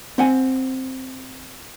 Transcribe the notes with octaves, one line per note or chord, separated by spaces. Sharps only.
C4 F#5 G#5